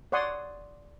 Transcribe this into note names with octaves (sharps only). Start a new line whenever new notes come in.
C#5 D5 F#5 C6 D#6